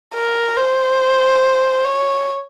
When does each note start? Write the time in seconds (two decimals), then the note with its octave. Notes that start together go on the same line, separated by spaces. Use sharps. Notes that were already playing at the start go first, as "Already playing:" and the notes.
0.14 A#4
0.56 C5
1.84 C#5